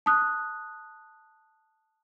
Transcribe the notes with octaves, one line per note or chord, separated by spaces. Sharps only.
A5 D#6 F#6